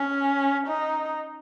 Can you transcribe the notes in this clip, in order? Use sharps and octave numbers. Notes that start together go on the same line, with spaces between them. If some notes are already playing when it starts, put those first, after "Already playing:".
Already playing: C#4
D#4